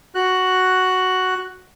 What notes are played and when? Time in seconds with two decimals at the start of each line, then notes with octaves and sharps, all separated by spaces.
0.15 F#4 F#6